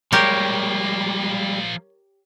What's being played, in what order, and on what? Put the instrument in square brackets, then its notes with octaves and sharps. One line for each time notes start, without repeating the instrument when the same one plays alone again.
[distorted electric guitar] F3 A#3 [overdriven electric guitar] G3 G#3 [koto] G4 A#4 C#5